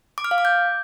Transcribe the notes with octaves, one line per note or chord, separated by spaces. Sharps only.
D6
F6
F5
D6
G6